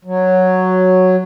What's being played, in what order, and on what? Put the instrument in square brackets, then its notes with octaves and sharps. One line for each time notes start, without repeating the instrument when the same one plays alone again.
[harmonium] F#3